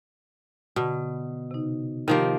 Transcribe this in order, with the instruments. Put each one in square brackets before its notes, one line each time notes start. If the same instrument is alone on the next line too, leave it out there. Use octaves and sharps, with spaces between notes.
[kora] B2 [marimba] D3 A5
[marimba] C3 D#4
[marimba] C3 F4 G4 [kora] D#3 F3 A#3